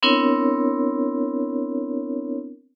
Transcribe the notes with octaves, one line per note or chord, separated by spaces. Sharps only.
B3 C4 D4 E4 A#4 C#5